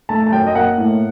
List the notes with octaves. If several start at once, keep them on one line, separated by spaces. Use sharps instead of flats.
A3 A5
A5
F#2 G5
D#5
A#3 F#5
A2